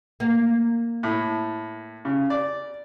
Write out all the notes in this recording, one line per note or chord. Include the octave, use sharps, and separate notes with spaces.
A#3
A2
C#3
D5